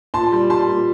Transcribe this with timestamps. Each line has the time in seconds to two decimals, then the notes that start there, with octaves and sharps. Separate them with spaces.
0.14 A#2 A5 C6
0.32 G3
0.50 G3 A5 C6
0.68 A#2